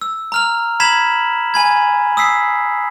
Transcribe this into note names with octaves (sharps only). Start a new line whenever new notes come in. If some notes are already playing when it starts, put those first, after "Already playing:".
E6
A#5 F6 F7
A#5 B5 G#6 B6 E7 F#7
G#5 B5 G#6
D#6 E6 B6 C7